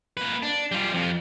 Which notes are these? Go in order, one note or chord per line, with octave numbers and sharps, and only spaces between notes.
A#3 B4
D4
G3 F4
F2 F3